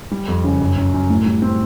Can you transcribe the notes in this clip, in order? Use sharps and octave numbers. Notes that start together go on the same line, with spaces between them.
G3
F2
C#3
F#2
F#2
F#2
A2
G3
C4